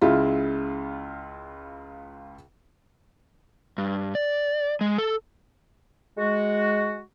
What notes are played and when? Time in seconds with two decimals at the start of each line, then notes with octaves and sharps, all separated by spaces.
0.01 C#2 C#3 E4 F4
3.78 G2
4.15 D5
4.81 G#3
4.98 A4
6.18 G#3 F#4